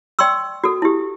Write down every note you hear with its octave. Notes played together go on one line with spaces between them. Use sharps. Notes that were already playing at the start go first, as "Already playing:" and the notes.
D5 G5 C6 C#6 E6
F#4 A4
E4 G4